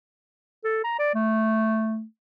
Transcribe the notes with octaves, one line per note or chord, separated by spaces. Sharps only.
A4
A#5
D5
A3